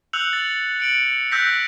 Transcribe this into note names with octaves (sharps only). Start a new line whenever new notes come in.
E6 F#6 G6 C#7 F7 F#7
A6
C#7 D7 F#7
E6 F#6 G6 A#6 B6